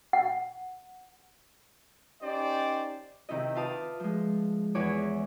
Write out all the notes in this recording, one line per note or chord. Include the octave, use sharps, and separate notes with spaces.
F#5
C#4 D#4 G4 C5 D5
C3 D#3 D#4 E4 D#5
F4 B4 F5 A5 D6 D#6
F3 G#3
E2 E3 C#5 G#5 D6